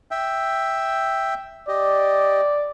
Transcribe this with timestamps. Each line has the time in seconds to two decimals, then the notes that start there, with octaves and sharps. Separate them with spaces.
0.11 E5 G5
1.69 G4 D5 D#5